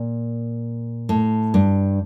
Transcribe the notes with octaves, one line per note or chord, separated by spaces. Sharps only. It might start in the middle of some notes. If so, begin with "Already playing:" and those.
Already playing: A#2
A2
G2